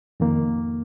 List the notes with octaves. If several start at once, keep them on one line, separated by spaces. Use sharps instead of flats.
F2 D#3 A#3